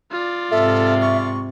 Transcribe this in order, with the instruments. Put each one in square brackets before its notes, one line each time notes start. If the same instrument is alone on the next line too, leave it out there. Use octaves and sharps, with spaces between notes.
[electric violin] F4 D5
[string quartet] G#2 C3 [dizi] A4 [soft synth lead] E5
[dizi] C#6